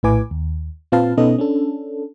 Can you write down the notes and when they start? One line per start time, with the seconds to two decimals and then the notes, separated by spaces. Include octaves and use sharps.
0.03 A#1 A2 E4 B4 G#5 D6
0.31 D#2
0.92 A#2 C4 F4 B4 F5 A5
1.17 B2 B3 C#4 D#4 A4 D#5
1.38 C#4 D4 A4